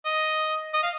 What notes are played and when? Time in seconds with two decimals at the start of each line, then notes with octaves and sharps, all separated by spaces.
0.06 D#5
0.74 D#5
0.83 F5